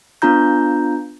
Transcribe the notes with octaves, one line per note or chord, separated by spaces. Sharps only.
B3 D4 F4 A#5 G6